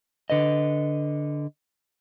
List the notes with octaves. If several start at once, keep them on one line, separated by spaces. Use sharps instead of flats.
D3 B4 D#5